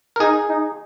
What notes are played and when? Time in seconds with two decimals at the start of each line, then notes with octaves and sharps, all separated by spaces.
0.16 A#4
0.20 D#4 G#4
0.49 D#4